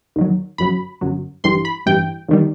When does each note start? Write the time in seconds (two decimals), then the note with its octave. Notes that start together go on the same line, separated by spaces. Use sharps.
0.16 D#2 D#3 F#3
0.58 G1 F#2 F#3 B5
1.01 G1 F#2 F#3
1.44 A1 G2 E3 G3 C6
1.65 B5
1.86 A1 G2 E3 G3 G5
2.28 D#2 D#3 G3